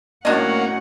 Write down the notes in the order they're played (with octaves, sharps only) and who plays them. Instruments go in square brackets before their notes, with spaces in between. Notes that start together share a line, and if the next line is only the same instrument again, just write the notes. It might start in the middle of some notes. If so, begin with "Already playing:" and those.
[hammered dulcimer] A2 F#3 C#5 [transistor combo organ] A#3 [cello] C#4 F#5 [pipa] D4 D#5